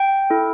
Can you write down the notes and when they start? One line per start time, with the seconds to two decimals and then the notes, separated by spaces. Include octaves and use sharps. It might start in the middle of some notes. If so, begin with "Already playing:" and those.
Already playing: G5
0.30 E4 A4